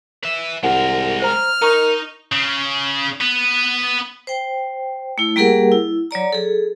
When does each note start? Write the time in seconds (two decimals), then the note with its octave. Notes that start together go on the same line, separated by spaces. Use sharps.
0.23 B4 E5
0.63 C2 G#3 A#4 F#5
1.22 C5 A#5 F6
1.62 D#4 A#4 A#5 C#6
2.32 C#3
3.21 B3
4.27 C5 G5
5.18 A3 E4
5.36 G3 A#3 G4 G#4 A#4 F#5
5.72 E4
6.11 F#3 C#5 D5 A#5
6.33 G#4 A4